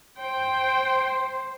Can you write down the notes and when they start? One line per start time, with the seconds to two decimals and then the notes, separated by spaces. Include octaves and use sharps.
0.18 C5 G5